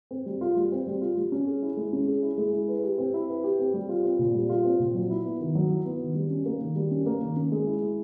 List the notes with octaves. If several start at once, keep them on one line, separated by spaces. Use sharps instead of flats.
C4
G3
F4
G3
C4
G3
F4
G3
C#4
G#4
E4
G#3
C#4
G#4
E4
G#3
E4
B4
G4
C4
E4
B4
G4
C4
G3
F4
C4
A#2
G3
F4
C4
A#2
F#3
E4
B3
D#3
F#3
E4
B3
D#3
G3
C#4
A#3
D#3
G3
C#4
A#3
D#3
C#4
G#3
E4
G#3